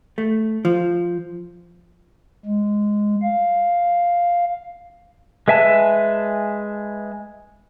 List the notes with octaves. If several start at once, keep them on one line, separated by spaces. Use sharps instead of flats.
A3
F3
G#3
F5
G#3 B4 E5 G#5 A5